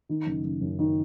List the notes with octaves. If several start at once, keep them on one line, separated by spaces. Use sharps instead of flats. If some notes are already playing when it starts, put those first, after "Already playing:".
D#3
F#1
F#1
F#2
D#3